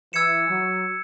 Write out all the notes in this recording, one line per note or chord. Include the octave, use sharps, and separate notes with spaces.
E3 E6 G#6 C#7 E7
F#3